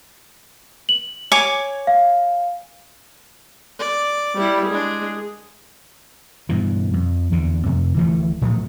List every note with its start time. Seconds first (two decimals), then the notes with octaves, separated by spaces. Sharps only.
0.89 F#7
1.32 C#5 G#5 D6
1.87 F5
3.79 D5
4.39 G3 E4
4.69 G#3 D4 G#4
6.49 G2 B2 E3
6.94 F2
7.32 E2 D3
7.66 F2 C3
7.96 D1 E3 F3 A3
8.42 A2 F3 F#3 A3